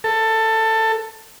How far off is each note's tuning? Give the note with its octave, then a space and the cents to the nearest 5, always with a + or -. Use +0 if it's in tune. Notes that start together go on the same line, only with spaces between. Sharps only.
A4 +15